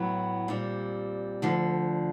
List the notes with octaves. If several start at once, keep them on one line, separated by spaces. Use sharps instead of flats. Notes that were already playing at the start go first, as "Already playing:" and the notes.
Already playing: A2 F#3 B3 E4
A#2 G3 C4
D2 D3 F3